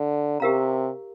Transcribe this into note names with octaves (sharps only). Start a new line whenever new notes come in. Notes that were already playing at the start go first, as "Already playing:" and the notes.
Already playing: D3
C3 G4 A#4 F5 A#5